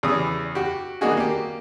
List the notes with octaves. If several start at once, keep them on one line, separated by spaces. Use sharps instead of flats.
E2 C#3 G3 D#6
F#4 G4
G3 A#3 D4 D#4 F#4 G#4
A#3 G4